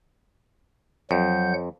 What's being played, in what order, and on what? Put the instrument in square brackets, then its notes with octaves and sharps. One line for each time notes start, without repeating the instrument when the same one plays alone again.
[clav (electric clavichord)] F2 [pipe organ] F#3 F#5 G6